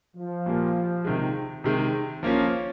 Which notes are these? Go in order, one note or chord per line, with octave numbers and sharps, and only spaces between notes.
F3
A#2 G3 A#3
C3 D#3 G#3
C3 D#3 G#3
F3 A#3 C#4 F4